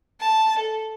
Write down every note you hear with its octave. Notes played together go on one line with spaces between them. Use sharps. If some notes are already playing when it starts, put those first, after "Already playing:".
A5
A4